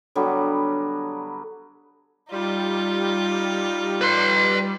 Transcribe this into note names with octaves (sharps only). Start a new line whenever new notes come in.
D3 F#3 G3 B3
G3 D#4 F4
B4 C6